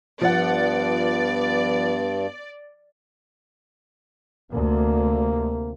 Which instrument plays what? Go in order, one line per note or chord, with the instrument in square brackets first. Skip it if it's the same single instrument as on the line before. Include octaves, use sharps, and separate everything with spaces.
[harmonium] G2 [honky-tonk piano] F3 F#5 [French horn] B3 [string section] D5
[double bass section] D2 [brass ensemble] C3 A#3